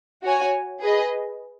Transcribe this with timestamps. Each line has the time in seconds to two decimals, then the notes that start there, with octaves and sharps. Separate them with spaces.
0.24 F#4 C#5 G#5
0.81 G#4 B4 D#5